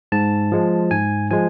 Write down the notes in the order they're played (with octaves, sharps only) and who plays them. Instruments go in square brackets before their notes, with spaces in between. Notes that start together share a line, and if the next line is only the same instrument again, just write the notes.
[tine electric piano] G#2 A5
F3 G#3
G#2 G#5
F3 G#3 G#5